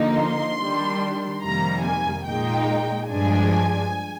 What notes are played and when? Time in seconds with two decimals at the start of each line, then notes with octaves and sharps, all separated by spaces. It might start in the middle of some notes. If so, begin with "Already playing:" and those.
Already playing: D3 F3 A#3 D#4
0.18 C6
0.60 D#3 G3 D4
1.43 F2 C3 D#3 G3 A#3 A#5
1.84 G#5
2.26 A#2 G#3 D#4 G5
3.09 G2 F3 G#3 D4 G#5